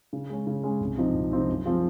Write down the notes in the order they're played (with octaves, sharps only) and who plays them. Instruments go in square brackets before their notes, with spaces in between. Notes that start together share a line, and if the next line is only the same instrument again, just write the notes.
[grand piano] C#3
G#3 C#4
C#3
G#3 C#4
C2
C3 F3 C4 D#4
C2
C3 F3 C4 D#4
F#2
F3 C4 F4 G#4